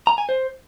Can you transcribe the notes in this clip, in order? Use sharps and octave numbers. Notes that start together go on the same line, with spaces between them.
A#5
G#5
C5